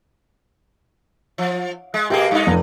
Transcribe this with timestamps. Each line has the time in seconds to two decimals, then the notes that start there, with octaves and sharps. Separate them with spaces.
1.38 F3
1.94 G#3
2.10 B2 A#3 G4 G#4
2.31 G2 D#4
2.47 F1